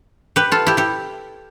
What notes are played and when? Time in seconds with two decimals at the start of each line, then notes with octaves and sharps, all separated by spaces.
0.36 G4 B4
0.52 F4 A4
0.67 E4 G4
0.77 E4 G4